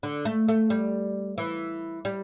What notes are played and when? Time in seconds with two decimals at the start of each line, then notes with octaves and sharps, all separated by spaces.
0.03 D3
0.25 A3
0.48 A3
0.70 G3
1.38 E3
2.05 G3